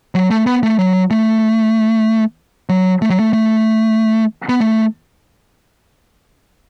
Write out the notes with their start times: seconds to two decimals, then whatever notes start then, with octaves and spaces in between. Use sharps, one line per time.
0.15 F#3
0.31 A3
0.46 B3
0.63 A3
0.79 F#3
1.11 A3
2.69 F#3
3.02 A3
3.10 F#3
3.19 A3
3.33 A3
4.49 B3
4.61 A3